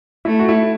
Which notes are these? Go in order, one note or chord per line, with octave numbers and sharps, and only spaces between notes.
A3 E4
F#4
E4